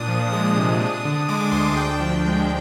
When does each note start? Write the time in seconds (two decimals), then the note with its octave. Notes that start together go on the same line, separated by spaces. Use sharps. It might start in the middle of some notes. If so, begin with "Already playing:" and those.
Already playing: A#2 D4 D#6
0.08 F3
0.32 G#3 D#6
0.57 C3
0.80 D4
1.05 D3
1.29 G#3 D6
1.41 D6
1.52 D2 C6
1.77 D4 G5
2.00 F3
2.24 G#3